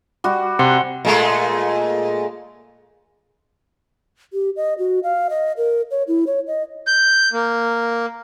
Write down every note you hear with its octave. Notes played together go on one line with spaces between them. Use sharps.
G3 F#4
C3 F#5 C6
A#2 G#3 A3
G4
D#5
F#4
F5
D#5
A#4
C#5
E4
C#5
D#5
G6
A#3